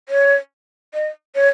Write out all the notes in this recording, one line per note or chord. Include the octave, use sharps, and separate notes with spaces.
C#5
D#5
C#5